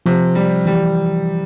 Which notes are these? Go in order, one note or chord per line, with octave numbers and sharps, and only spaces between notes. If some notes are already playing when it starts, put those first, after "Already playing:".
C3 F3
G3
E3 G3